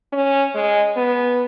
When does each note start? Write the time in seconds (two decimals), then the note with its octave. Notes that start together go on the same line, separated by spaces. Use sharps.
0.13 C#4
0.55 G#3
0.96 B3